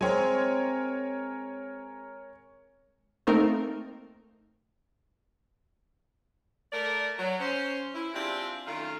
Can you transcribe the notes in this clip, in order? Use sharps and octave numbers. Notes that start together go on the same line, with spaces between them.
G#3 C4 A#4 C#5 G#5
A3 A#3 C4 D#4 A#4
A3 A#4 D5
F#3
C#4 C5
E4
G#3 C4 D4 E4 F4 G4
F#2 D#3 A3 F4